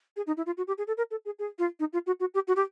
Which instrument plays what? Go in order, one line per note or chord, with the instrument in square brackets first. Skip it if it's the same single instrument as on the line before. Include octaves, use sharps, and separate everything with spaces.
[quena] G#4
D#4
E4
F4
F#4
G4
G#4
A4
A#4
A4
G#4
G#4
F4
D#4
F4
F#4
F#4
G4
F#4
G4